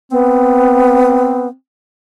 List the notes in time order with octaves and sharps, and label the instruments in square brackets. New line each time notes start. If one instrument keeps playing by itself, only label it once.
[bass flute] B3 [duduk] C4